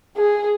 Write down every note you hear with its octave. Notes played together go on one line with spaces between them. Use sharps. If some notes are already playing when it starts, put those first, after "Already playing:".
G#4